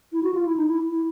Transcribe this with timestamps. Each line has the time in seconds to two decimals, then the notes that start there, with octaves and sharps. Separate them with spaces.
0.12 E4
0.23 F#4
0.34 F4
0.45 E4
0.57 D#4
0.68 E4
0.90 E4